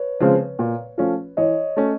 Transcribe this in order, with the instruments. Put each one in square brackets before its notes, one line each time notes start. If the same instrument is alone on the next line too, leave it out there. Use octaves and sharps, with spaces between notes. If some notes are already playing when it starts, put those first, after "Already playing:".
Already playing: [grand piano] B4 C#5
[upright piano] C#3 F3 G#3 C4
A#2
F3 A3 C#4 F4
[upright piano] E3 [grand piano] C#5 D#5
[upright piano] A3 C#4